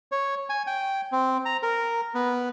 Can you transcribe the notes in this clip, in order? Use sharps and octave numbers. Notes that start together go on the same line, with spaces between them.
C#5
G#5
G5
C4
A#5
A#4
B3